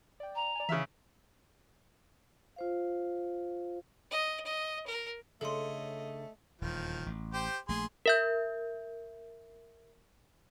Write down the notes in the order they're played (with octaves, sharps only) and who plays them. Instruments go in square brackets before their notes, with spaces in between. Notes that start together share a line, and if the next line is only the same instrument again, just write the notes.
[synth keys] D5 G5
[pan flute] A#5
[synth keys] D5 G#5
[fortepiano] C#3 E5 [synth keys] E3 F6
[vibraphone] F4 C5 F5
[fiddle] D#5
D#5
A#4
[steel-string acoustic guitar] C#3 D4 C#5 [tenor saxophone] A3 [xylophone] A4 C6 [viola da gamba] D#5
[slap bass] D#1 E2 [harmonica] D#3 F3
[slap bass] A1
[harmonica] G4 C5
[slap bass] A#1 A3 [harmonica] G#4 C6
[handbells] A#4 E5 G6